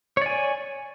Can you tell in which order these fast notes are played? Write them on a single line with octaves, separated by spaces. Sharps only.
C#5 D5 G#5